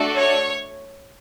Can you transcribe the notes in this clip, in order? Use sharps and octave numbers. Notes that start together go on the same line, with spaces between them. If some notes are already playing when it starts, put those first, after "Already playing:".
Already playing: A3 D4 F#4 A4
C#5